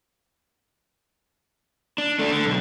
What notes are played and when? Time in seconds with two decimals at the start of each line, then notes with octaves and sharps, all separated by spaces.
1.98 D4
2.19 A3 D4
2.32 D3
2.46 B1